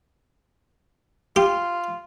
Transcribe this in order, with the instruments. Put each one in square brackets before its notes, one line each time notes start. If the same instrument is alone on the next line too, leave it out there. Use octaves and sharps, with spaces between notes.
[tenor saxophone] F4 [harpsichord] G4